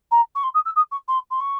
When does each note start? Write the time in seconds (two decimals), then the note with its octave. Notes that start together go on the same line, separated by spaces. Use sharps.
0.11 A#5
0.35 C#6
0.43 C6
0.54 D#6
0.65 E6
0.76 D#6
0.91 C#6
1.08 C6
1.31 C6
1.40 C#6